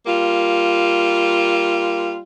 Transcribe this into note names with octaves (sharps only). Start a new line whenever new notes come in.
G3 A#3 F4